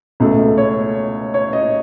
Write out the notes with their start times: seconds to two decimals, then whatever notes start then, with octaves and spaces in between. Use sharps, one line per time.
0.20 C#2 B2 A3
0.58 C#5
1.34 C#5
1.53 D#5